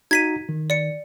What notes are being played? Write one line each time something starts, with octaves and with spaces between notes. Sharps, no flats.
D#4 F#4 A#5 G#6 B6 D#7
D#3
D5 C#7